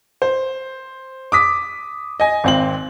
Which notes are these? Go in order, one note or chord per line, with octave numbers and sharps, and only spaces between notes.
C5
D6 D#6 B6
D#5 G#5
G#1 C4 F#7